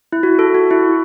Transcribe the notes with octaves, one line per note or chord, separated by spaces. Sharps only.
E4
F#4
A4
F#4
E4